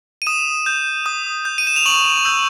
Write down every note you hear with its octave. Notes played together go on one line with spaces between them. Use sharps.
D#7
D#6 E7
G6
D#6
G6
D#7
E7
F7
C#6 F#7
E6 G6